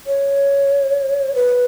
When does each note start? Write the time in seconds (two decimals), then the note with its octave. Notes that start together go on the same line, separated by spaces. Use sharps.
0.07 C#5
1.35 B4